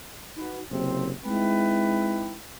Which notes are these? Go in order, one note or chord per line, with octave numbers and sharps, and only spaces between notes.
D#4 F#4 B4
F#1 C3 C4
G#3 C4 D#4 E4 B4 G5